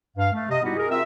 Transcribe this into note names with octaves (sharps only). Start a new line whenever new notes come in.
G2 F5
A3
C3 D#5
G3 B3 D#4 E4 F#4 G4
G#4 A#4
C4 F4 A#4 E5